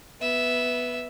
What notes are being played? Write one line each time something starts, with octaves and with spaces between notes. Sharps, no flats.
B3 E5